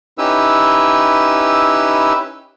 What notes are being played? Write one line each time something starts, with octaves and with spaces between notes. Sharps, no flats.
C#4 D#4 E4 G4 B4 E6